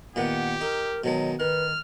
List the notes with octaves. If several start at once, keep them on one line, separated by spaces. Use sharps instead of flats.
A#2 D#3 B3 G4 F#5
D#4 A#4
B2 D#3 F#3 G#3
D#3 B4 F6